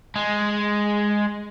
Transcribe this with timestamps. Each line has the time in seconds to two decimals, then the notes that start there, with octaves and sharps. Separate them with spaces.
0.16 G#3